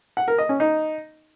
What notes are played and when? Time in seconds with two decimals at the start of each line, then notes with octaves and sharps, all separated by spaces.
0.17 F#5
0.28 A#4
0.38 D#5
0.49 C#4
0.60 D#4